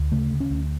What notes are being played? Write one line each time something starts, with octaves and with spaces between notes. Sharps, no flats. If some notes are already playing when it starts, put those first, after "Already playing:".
Already playing: D2
C#3 A3
D2
C#4
D2